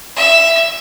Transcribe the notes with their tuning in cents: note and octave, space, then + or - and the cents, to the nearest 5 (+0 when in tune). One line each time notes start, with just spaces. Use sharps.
E5 +10